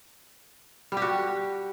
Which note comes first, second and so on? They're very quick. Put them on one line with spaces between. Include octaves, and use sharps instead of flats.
G3 G4 F#4